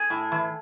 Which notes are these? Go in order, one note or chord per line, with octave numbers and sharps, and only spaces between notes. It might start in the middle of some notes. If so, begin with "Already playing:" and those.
Already playing: G#4
A2
E3